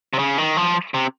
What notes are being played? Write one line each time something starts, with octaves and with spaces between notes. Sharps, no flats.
C3
C#3
D#3
F3
C3